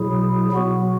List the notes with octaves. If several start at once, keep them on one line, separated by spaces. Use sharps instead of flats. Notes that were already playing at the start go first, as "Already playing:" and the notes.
Already playing: B2 F#3 E4 G#4
B2 F#3 B3 F#4